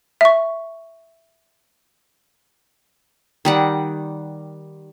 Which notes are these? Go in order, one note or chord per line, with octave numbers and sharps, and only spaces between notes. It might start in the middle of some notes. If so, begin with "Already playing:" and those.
E5 C#6
D#3 G3 F#5